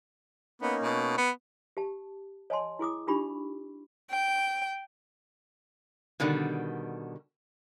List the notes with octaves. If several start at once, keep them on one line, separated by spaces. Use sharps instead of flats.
A#3 B3 C#4 D#4
B2
B3
G4 A5
C#5 D#5 G#5 A5 C6
E4 G#4 D6 D#6
D4 D#4 F4 G4 B5 C#6
G5
B2 D3 D#3 G3